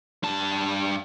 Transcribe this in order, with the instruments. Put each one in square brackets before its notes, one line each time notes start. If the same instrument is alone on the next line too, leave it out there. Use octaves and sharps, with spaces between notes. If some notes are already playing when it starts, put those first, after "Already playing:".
[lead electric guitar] G2 A5